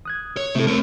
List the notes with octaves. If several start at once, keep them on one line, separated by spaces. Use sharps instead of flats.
D#6 F#6 G#6
C#5
C3 A3 E4 A4
A3 C4 A#4 C#5